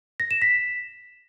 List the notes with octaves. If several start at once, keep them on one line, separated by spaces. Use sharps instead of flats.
A#6
E7
B6